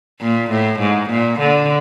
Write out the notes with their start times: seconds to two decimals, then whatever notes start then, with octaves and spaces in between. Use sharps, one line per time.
0.21 A#2
0.52 A2
0.80 G#2
1.10 A#2
1.40 D3